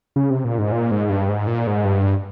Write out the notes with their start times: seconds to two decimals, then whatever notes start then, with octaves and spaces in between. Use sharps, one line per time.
0.16 C#3
0.30 C3
0.45 A#2
0.58 G#2
0.72 A#2
0.91 G#2
1.10 G2
1.29 G#2
1.47 A#2
1.67 G#2
1.85 G2